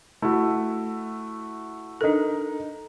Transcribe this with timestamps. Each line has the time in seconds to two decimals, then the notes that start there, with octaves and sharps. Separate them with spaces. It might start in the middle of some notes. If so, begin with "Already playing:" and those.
0.22 A3 E4 F#4
2.01 D4 D#4 A4 A#4